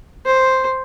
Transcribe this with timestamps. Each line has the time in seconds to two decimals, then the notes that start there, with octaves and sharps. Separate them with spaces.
0.26 C5